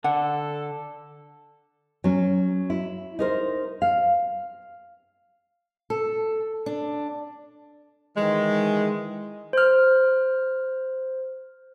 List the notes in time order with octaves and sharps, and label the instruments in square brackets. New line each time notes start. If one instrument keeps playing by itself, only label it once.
[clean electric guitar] D3 [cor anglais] A4 [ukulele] F#5
[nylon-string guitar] F#3 C#4
E4
D#4 A#4 C5
F5
[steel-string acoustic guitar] A4
D4
[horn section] D#3 E3 G#3
[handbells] C5 F6